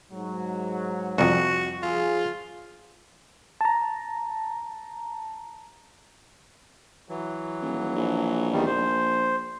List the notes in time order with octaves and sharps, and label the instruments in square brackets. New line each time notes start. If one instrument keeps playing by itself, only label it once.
[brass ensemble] G#2 F#3
[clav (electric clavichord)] C2 F2 [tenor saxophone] F#4
[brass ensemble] F3 G#4 [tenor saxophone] F4
[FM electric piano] A5 A#5
[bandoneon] E3 F#3
[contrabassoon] D#1
A#1
[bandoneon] E2 D#3 G3
[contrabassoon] A#1 [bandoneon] C5